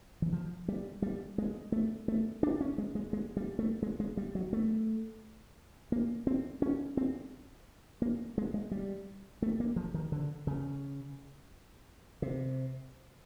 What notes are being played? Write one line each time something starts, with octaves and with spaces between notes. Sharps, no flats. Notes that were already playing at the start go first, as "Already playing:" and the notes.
E3
F3
G3
G3
G#3
A3
A3
D4
C#4
G#3
G#3
G#3
G3
A3
G#3
G#3
G3
F#3
A3
A#3
C4
C#4
C4
A#3
G#3
G#3
G3
A3
A#3
F3
D#3
D3
C#3
C3